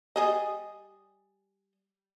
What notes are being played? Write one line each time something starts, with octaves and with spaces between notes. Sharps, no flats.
G3 G#4 D#5